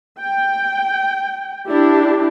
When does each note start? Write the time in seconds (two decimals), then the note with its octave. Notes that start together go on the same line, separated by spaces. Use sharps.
0.18 G5
1.69 D4 E4 G4